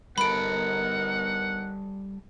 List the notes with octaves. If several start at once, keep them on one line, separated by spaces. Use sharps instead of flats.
G3 B3 D#4 A4 A#4 F#5 B5 D7